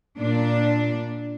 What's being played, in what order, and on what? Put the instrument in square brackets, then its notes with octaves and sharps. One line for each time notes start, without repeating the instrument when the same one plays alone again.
[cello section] A#2 D4